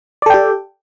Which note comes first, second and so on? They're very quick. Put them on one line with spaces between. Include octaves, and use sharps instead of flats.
D5 A4 G5 G4